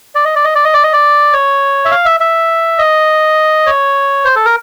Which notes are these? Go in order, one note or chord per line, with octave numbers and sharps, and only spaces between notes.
D5
D#5
D5
D#5
D5
D#5
D5
D#5
D5
C#5
E5
F5
E5
E5
D#5
C#5
C5
A4
A#4